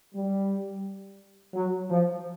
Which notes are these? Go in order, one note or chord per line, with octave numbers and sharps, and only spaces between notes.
G3
F#3
F3